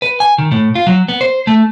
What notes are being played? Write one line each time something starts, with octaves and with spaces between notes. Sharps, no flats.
B4
G#5
D#3
A2
F4
F#3
B3
C5
A3